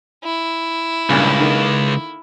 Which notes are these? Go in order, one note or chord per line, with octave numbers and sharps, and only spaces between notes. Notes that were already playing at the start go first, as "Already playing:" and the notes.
E4
C#2 G2 A#2 C#3
D3 D#3 A#3